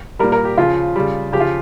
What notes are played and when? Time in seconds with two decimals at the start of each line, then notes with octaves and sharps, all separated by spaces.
0.19 A#2 G3 A#4
0.32 A#4
0.45 G4
0.57 C#3 F3 F4
0.96 C#3 G3
1.33 C#3 F3 G4
1.40 F4